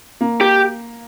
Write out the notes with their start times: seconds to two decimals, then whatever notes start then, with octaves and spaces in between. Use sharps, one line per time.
0.21 A#3
0.41 G4